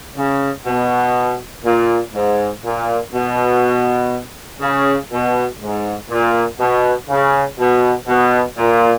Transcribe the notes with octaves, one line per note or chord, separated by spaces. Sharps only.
C#3
B2
A#2
G#2
A#2
B2
C#3
B2
G#2
A#2
B2
C#3
B2
B2
A#2